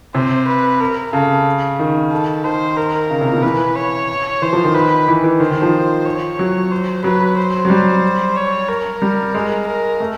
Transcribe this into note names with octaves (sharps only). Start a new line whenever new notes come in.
C3 C5
B4
A#4
C#3 A4
D#3
A4
D#3 C5
A#4
C#3
C3
B2
E3 B4
C#5
E3 C5
F3
D#3
B4
E3
E3
D#3 C5
D#3
F3
C#5
F#3
C5
F#3 B4
C5
F#3
G3
C#5
A#4
G3
G#3
A#4
A3